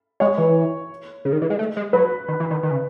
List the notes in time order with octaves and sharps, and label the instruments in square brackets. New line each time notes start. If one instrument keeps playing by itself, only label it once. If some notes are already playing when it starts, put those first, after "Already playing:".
[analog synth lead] G#3 [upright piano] C#5
[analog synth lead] E3
C#3
D#3
E3
G#3
A3
G#3
[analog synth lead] F#3 [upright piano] B4
[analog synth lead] D#3
E3
D#3
D#3
C#3